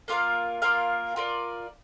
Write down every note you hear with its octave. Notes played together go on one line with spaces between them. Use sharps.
A#3 F4 A#4 F5
A#3 F4 A#4 F5
F4 A#4 D5